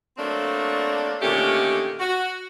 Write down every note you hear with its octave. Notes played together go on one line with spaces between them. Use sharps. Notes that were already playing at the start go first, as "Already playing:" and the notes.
F#3 A3 A#3 C4 D4
A#2 D3 D#3 A3 C#4 G4
F#4